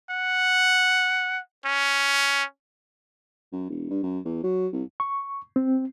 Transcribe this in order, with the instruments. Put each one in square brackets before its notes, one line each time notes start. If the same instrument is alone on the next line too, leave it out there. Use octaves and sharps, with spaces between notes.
[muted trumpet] F#5
C#4
[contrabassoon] F#2
E1
G2
F#2
E2
F#3
C2
[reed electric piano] C#6
C4